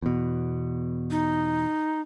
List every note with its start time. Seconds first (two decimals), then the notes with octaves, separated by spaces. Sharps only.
0.02 E2 B2
1.11 D#4